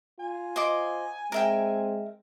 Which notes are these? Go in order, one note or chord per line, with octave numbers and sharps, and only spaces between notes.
F4 G#5
C5 D#5 D6
G#3 C4 A#4 E5 G5